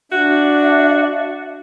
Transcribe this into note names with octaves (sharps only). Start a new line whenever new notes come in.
D4 F#4 E5